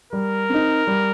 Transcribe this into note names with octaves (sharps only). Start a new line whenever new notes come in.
G3 A#4
C4 D#4
G3